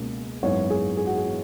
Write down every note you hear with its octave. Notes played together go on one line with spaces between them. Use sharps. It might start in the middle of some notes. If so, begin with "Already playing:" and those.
Already playing: C#2 B2 A#3 C#4
G#1 F#2 E3 B3 C#5
G#4
G#4
F#4
G#4
E3 B3